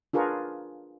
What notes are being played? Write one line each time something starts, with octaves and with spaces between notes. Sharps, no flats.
D4 F4 G#4 A#4 B4 C#6